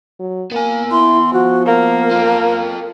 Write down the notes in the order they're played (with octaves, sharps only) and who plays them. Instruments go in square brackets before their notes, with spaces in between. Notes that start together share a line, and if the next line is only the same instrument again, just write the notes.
[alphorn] F#3
[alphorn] A#3 [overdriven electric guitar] B3 G#5
[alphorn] E4 [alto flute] C6
[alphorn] F3 [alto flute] F#4
[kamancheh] A#3 [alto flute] A#4
[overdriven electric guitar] F4 A4